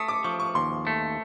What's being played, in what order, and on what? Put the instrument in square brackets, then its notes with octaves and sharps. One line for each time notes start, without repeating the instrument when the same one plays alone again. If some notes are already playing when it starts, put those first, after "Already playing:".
Already playing: [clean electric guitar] A3 [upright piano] D#6
[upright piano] D6
[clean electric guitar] F3 [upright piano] C#6
[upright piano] C#6
[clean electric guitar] D#2 [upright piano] C6
[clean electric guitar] A3